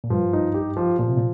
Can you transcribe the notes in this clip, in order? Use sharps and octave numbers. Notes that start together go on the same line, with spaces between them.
A#2
G2 F3
D#4
G4
F3
A#2 F3
C3
A#2